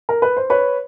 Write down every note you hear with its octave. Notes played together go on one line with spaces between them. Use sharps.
A#4
B4
C5
B4 C#5